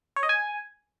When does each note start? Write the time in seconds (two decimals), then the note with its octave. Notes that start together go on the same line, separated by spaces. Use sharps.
0.16 C#5
0.23 D#5
0.29 G#5